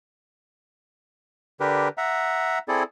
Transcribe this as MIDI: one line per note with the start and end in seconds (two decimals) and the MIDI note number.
1.60 1.88 50
1.60 1.88 62
1.60 1.88 67
1.60 1.88 70
1.60 1.88 71
1.98 2.59 76
1.98 2.59 78
1.98 2.59 82
2.68 2.83 60
2.68 2.83 64
2.68 2.83 68
2.68 2.83 69
2.68 2.83 74